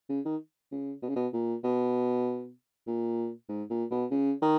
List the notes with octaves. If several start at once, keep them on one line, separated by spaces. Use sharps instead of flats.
C#3
D#3
C#3
B2
C#3
B2
A#2
B2
A#2
G#2
A#2
B2
C#3
D#3